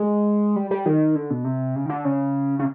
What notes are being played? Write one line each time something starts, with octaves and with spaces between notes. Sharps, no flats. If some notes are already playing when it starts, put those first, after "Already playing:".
Already playing: G#3
G3
G3
D#3
D3
B2
C3
C#3
D#3
D3
C#3
C#3